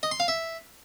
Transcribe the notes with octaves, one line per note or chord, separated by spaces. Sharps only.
D#5
C6
F5
E5